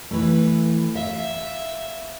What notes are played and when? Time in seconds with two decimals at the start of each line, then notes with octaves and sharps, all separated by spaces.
0.11 E3 A3 B4
0.95 E5 F5